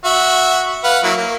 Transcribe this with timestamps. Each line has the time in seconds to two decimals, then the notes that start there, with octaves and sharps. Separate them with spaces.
0.05 F#4 E5
0.84 B4 F5 F#5
1.03 F#3 A#3 E4
1.17 A#3